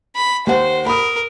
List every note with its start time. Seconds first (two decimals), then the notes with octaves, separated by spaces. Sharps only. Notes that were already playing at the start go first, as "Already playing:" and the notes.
0.16 B5
0.47 D#2 C5 F#5
0.86 A#4 B5 D#6